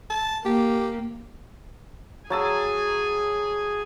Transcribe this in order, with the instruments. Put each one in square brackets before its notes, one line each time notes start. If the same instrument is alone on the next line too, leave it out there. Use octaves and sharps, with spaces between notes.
[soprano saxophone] A5
[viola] A#3 [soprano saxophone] G4
[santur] F#3 A5 E6 [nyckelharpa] G#4 G#5